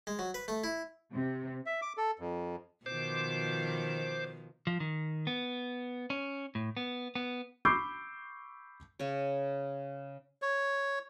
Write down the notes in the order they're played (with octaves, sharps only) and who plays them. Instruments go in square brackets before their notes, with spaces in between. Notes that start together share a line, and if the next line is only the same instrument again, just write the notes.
[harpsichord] G#3
F#3
B4
A3
E4
[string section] C3
[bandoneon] E5
D6
A4
F2
[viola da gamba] B2 D#3 F3 [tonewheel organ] C5 D6
[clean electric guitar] F3
D#3
B3
C#4
A2
B3
B3
[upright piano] B5 C#6 D6 E6 G6 C7
[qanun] C#3 C#5
[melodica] C#5